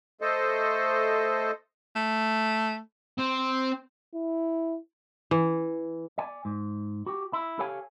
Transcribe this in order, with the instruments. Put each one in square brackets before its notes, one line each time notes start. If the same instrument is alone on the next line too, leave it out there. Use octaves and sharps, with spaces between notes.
[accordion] A3 A4 C5 D#5
[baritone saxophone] A3
[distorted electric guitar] C4
[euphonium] E4
[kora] E3
[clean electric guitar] D5 G#5
G#2
F#4 G4
E4
G4 A4 C#5 F5 G#5